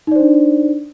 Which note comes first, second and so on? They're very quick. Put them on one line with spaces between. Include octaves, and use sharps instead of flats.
D#4 D5 C5 D4